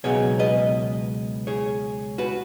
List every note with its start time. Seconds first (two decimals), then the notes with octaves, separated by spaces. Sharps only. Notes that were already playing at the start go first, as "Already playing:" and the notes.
0.04 C#2 B2 F#3 B3 D#4 G#4 C#5
0.39 B4 D#5
1.47 G#4 C#5
2.18 F#4 B4